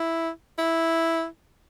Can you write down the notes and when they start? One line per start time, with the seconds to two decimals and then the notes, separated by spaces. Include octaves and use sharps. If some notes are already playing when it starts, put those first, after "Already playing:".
Already playing: E4
0.59 E4